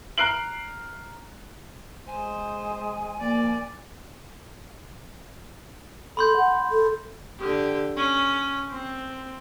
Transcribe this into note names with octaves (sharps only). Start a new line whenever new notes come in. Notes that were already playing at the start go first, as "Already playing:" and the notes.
A#5 F6 F#6 C7 D7 F#7
G#3 C5 G#5
F3 A#3 D5
A4 B5 C6 G6
F#5
A4
D3 G4
C#4
C4